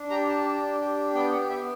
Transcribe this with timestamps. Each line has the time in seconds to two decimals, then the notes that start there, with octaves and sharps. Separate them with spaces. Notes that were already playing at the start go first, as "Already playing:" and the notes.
Already playing: D4
0.10 G4 A#5
0.29 A5
0.45 D4
0.80 G4
1.15 B3 G5
1.33 F#5
1.50 B3 E5